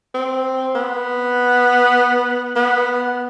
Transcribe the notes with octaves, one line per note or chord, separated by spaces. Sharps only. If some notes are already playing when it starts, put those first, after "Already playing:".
C4
B3
B3